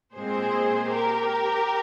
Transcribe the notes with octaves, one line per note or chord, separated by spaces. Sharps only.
A#2 G#3 C4 G#4 C5
G4 A#4